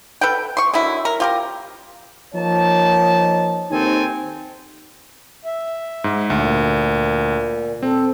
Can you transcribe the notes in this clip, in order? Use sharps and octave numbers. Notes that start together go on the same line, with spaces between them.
A4 B4 F#5 G5
C6 C#6
D3 D#3 F#3 E4
A#4
F4 G4 A#4
F3 A#3 D#4 C#5 A5
D#2 D#3 C4 D#4 A4 G#5
E5
G#2
D2 A#2
C4 A4